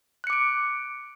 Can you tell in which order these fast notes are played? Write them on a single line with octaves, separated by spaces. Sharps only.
F#6 C#7 D6 D7